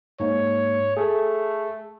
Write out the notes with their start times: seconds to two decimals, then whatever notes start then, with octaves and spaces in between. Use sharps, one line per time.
0.20 G#2 A#3 C#5
0.97 A3 G#4 A4